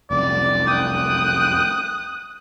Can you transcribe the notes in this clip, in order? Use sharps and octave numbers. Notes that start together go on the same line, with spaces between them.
F1 C2 F#2 D5
G5 D#6 F#6